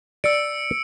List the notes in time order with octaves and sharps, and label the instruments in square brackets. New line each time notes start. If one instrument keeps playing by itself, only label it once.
[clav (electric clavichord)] D5 [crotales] E6 C#7 D7